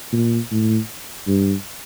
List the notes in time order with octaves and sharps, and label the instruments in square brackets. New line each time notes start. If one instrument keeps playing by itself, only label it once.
[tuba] A#2
A2
G2